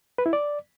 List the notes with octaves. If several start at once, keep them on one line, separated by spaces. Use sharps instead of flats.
B4
E4
D5